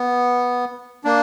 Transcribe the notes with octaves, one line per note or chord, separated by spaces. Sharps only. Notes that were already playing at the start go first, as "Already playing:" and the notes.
Already playing: B3
A#3 D4